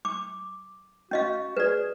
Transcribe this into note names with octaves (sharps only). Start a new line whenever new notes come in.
D6
C#4 F#4 D#5 F5
G#4 B4 D5